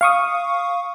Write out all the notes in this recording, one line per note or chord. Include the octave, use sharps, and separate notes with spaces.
F5 C#6 D#6